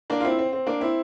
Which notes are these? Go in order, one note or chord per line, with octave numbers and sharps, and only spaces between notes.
A#3 D4
F4
C4 E4
C4
C4
A#3 D4
C4 E4